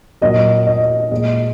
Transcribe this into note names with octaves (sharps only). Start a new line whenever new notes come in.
A#2 F#3 A#3 D#5
D#5
A#2 G#3 D#5